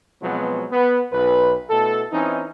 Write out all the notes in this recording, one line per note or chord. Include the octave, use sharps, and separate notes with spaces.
B2 F3 F#3 G#3 B3 C4
B3
B1 B4
B2 A3 E4 A4
E3 C4 C#4 D#4